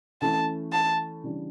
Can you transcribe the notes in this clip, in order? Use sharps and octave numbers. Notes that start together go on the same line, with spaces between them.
E3 A3 C#4 E4 A5
A5
C#3 E3 G3 D4